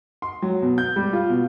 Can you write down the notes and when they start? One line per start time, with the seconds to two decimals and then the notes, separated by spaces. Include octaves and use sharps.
0.22 C6
0.42 F#3
0.62 B2
0.78 G6
0.96 G3
1.13 F4
1.29 B2